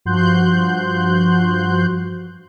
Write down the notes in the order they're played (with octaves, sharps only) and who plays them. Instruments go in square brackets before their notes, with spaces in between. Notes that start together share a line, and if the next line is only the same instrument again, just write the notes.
[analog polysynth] G2 F3 F#4 C6 F#6 G6